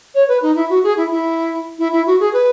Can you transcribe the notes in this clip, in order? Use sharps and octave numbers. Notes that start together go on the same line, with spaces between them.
C#5
B4
D#4
E4
F#4
G#4
E4
E4
E4
E4
F#4
G#4
B4